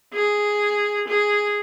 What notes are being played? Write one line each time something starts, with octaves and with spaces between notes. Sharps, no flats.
G#4
G#4